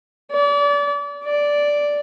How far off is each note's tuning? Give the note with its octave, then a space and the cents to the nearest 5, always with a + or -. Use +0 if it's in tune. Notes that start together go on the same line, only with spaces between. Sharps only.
D5 -35
D5 -5